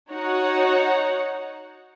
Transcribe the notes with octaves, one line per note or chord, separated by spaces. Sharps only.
D#4 F#4 C#5 F#5